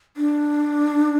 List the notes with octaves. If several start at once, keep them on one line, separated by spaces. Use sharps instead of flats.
D4